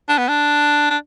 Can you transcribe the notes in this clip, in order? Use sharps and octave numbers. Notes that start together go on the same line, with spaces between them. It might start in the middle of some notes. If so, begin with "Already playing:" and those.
D4
B3
D4
D4